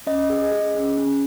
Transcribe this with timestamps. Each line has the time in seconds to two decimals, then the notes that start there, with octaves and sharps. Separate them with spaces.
0.07 C#4 D#5
0.30 G#4
0.51 G#4
0.75 C#4
0.97 C#4